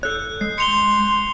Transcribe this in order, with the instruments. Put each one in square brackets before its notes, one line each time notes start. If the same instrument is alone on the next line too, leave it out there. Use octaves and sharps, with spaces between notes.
[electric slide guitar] A4 C#5 [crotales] F#6 G6
[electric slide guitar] G#3 [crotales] C7
[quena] C6 [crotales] C#7 F7 G7